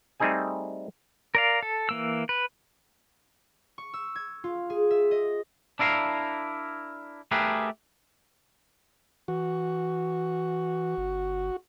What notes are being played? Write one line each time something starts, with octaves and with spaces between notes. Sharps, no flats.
G3 A3 C4 D#4 G#4 G#5
A#4 D5 F5
A4
E3 A#3 E6
B4
C#6
E6
G#6
F4
G#4
E5
D#5
D4 E4 A#4 F5
A3 G4 G#4 A#4 B4
E3 F#4
G1